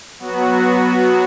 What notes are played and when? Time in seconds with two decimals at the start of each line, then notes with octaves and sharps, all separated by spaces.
0.19 F#3 B3 F#4